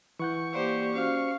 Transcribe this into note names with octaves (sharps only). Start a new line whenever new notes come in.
E3 F#5 C#6 G6
A#3 G4 C5 D5 F5
C#4 F#4 C5 F5